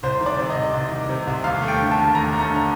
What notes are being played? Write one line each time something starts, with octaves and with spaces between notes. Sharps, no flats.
C2 C5
D#3
D5
C3
D#5
C2
C2
D#3
C3
C2
D#2 F5
A3
G5
D3
A5
D#2
D#2 A#5
A3
A#5
D3